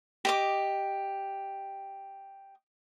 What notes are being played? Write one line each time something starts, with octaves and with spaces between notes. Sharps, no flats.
G4 D#5 D6